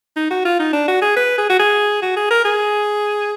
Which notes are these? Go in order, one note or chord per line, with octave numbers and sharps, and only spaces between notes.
D#4
F#4
F4
D#4
D4
F#4
G#4
B4
G#4
F#4
G#4
F#4
G#4
A#4
G#4